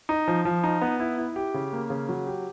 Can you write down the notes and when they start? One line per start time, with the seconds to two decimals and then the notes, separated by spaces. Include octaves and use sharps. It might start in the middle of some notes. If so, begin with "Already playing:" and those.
0.09 D#4
0.28 F3
0.45 F3
0.64 D#4
0.81 B3
1.00 E4
1.18 E4
1.36 G4
1.54 C#3
1.73 A#3
1.90 C#3
2.09 F#3
2.27 G4